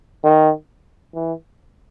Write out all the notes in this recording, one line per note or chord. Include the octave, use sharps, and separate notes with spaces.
D#3
E3